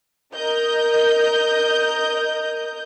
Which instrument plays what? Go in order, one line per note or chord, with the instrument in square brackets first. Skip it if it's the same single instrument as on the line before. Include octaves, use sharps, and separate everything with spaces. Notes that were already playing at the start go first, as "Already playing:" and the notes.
[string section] A#4 D#5 G6